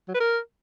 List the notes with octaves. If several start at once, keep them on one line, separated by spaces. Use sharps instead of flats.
F#3
B4
A#4